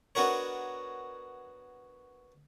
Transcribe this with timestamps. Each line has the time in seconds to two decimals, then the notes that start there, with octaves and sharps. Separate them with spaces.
0.15 B3 D4 F#4 A#4 C#5